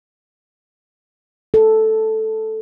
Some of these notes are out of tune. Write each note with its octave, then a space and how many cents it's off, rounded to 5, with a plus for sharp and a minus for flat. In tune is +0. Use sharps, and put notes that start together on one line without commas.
A4 +0